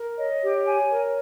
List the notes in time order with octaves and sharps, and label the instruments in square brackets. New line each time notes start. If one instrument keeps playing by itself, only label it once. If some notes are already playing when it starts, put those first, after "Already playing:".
Already playing: [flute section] A#4
[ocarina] C#5 [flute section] D#5
[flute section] G4
G#5
A#4